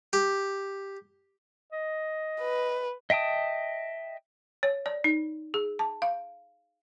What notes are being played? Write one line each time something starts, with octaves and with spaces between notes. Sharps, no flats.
G4
D#5
B4
D#5 E5 G5 A5 D#6
C#5
D5
D#4
G#4
A5
F5